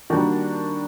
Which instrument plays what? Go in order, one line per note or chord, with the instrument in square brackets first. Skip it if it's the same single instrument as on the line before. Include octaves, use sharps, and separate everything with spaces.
[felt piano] D#3 G3 A#3 D4 F#4